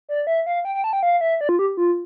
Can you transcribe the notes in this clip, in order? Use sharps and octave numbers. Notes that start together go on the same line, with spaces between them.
D5
E5
F5
G5
G5
A5
G5
F5
E5
D5
F4
G4
F4